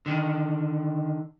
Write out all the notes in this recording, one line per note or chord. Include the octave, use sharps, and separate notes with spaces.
D3 D#3